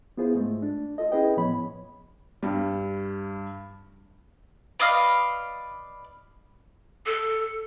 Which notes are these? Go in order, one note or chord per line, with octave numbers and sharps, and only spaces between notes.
B3 E4 F4 G#4 C5
G#2 G#3 A3
D4
F4 A4 D#5
C#4 E4 G#4 B4 D#5 G5
A2 F3 B3 C#5 B5
G2 G3
B4 D5 D#5 F5
A4